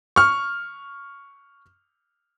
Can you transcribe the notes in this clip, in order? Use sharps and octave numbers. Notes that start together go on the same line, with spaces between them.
C#6 F6